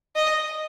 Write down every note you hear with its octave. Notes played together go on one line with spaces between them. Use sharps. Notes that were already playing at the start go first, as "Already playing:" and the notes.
D#5